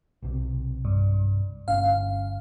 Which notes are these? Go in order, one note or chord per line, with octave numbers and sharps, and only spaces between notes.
B1 C3
G2
G1 C#4 F5